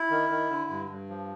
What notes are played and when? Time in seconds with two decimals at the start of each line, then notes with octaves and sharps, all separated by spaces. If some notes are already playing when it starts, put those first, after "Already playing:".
Already playing: E4
0.11 D#3
0.30 D#3
0.50 D3
0.70 G2
0.89 G2
1.09 F3